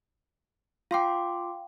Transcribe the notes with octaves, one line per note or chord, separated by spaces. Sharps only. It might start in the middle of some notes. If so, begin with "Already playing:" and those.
F4 F5 G5 C6 D6